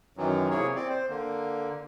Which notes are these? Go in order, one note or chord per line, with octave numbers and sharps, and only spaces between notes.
F#2 D#3 E3 F#3
C3 A#3 E4 G#4 C#5
C4 D5
C5
D3 A#3